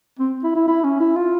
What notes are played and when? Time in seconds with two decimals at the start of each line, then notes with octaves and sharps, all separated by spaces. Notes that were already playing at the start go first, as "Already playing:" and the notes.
0.19 C4
0.44 E4
0.55 E4
0.68 E4
0.84 C#4
1.00 E4
1.16 F4